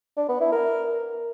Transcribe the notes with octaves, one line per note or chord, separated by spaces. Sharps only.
D4
B3
E4
A#4